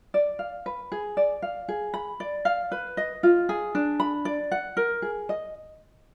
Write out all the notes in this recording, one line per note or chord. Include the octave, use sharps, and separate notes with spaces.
D5
F5
B4
G#4
D5
F5
G#4
B5
D5
F5
B4
D#5
F4
G#4
D4
B5
D5
F#5
A#4
G#4
D#5